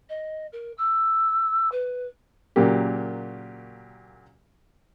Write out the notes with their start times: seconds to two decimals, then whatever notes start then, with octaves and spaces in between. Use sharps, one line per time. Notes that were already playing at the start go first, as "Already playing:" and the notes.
0.09 D#5
0.52 A#4
0.78 E6
1.71 B4
2.56 A#2 C#3 F#3 A#3 G4